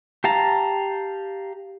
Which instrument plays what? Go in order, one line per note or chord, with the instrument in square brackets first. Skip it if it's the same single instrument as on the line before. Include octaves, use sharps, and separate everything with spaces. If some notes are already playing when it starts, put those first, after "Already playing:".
[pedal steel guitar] G4 F5 A5 A#5